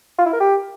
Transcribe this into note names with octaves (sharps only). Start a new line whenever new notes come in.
F4
E4
A#4
G4